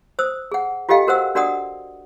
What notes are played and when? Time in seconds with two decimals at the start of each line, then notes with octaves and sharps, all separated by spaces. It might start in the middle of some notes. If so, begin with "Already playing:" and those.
0.19 C5 D#6 E6
0.52 G#4 F#5
0.89 F4 G4 A4 D#5 F5 G5
1.07 F#4 A#4 C5 F#5 E6
1.35 D4 F#4 A#4 D5 F#5 D#6